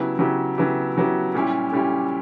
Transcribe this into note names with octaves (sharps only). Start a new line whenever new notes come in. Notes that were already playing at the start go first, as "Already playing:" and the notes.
Already playing: C#3 F#3 B3 E4 G4
C#3 F#3 B3 E4 G4
C#3 F#3 B3 E4 G4
C#3 F#3 B3 E4 G4
A#2 G3 C#4 E4 G4
A#2 G3 C#4 E4 G4